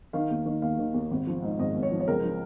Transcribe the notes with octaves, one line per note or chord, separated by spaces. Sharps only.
D#3 F5
D#2
D#3
D#2 F5
D#3
D#2
G#1
F3
G#2
G#1 D#5
G#1
C#5
F3
C#5
C#2 A#4
F3